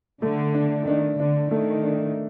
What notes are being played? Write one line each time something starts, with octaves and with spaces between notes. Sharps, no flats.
D3 A3
D4
D#3 D4
D3 D4
D#3 A3
D4